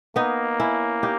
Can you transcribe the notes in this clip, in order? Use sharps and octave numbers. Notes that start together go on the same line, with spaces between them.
A#3 B3 D#4
C#4 E4
D#4 G4